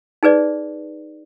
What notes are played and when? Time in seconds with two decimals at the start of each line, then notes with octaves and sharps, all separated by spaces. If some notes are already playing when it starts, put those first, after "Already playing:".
0.23 D#4 G#4 B4 D5